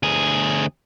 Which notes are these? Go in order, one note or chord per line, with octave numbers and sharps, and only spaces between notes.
D2 G#4